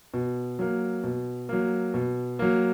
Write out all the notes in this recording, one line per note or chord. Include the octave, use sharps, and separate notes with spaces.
B2
F#3 A#3
B2
F#3 A#3
B2
F#3 A#3